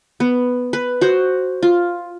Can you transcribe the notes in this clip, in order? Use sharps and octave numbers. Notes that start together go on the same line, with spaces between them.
B3
B4
F#4 C5
F4